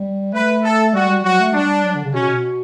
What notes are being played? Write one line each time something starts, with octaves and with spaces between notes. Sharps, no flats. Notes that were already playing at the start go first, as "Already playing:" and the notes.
Already playing: G3
A3 B4
A4
G3 F#4
G3
F#3 F#4
A3
G3 D4
F#3
D3
C#3
B2 C#4
B2